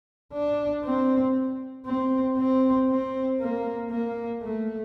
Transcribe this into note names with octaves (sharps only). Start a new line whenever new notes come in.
D4
C4
C4
C4
C4
A#3
A#3
A3